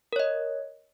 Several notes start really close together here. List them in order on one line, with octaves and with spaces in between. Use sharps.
A#4 C#5 D#5